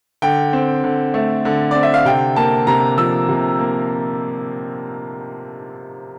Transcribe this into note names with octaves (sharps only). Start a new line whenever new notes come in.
D3 G5
C4
D3
A3
D3
C4 D5
E5
F5
C3 G5
A#3 A5
C3 A#5
F3 E6
C3
A#3